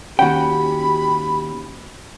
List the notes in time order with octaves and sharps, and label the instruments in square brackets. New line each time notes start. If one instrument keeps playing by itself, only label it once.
[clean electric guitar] D#2 C#4 [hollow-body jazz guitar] F#4 F#5 G5 [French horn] G4 [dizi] B5